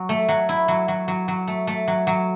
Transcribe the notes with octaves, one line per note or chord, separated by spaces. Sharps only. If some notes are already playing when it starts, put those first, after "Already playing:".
Already playing: F#3
A3
F#3
E4
F#3
F#3
F#3
F#3
A3
A3
F#3
F#3